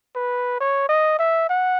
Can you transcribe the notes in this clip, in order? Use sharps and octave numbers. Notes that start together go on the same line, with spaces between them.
B4
C#5
D#5
E5
F#5